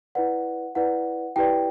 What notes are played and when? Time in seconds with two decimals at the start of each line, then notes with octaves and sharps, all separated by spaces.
0.15 E4 B4 D5 F#5
0.75 E4 B4 D5 F#5
1.36 E4 G4 B4 D5 G5